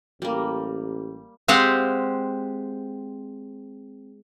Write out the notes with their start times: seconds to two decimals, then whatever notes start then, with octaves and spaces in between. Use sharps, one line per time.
0.22 A1 G3 A#3
1.48 G#3 C4 G4 C5 F5 F#5